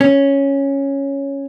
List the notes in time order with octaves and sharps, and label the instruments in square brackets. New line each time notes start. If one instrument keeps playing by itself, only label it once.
[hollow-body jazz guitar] C#4